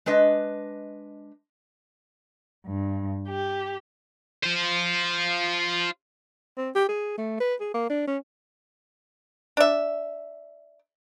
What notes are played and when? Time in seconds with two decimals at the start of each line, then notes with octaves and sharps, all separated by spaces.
0.06 G#3 D4 B4 D#5
2.67 G2
3.29 G4
4.44 F4 C5
6.57 C4
6.75 G4
6.89 G#4
7.18 A3
7.40 B4
7.60 G#4
7.74 A#3
7.90 D4
8.08 C#4
9.57 D4 E5